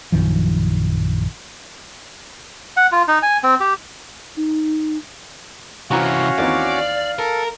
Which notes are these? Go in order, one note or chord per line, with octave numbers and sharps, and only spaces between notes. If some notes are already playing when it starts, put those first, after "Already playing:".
A#1 F#2 D#3 F3
F#5
F4
D#4
G#5
C4
G4
D#4
C3 E3 C#4 F#4 F5 F#5 A#5 C#6
D#2 E3 C4 D5
A4 A#4